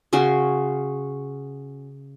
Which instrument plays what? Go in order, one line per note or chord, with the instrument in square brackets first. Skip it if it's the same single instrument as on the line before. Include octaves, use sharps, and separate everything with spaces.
[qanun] C#3 C#4 F#4 C6